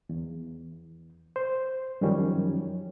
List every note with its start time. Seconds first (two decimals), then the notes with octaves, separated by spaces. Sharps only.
0.09 E2
1.36 C5
2.01 F#2 D#3 F3 G3 C#4